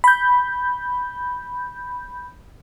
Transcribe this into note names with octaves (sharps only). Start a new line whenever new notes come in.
B5 G6